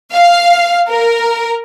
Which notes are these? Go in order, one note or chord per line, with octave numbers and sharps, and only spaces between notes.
F5
A#4